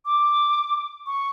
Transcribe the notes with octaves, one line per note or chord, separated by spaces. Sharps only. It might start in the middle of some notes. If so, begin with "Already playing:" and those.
D6
C#6